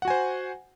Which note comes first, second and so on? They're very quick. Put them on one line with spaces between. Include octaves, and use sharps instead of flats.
F#5 F#4 G#5 C5